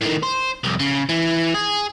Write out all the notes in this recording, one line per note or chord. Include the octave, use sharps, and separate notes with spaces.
A2 D#3
C5
C2 F2
C#3
E3
G#4